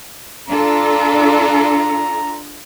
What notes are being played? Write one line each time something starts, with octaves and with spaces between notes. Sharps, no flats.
D4 F4 A4 A#5